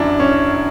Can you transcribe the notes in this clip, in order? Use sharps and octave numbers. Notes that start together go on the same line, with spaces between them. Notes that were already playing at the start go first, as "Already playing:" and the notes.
Already playing: F#2 D3 F#3 D4 E4
C#4